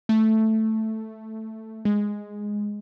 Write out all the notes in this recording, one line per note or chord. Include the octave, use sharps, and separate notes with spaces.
A3
G#3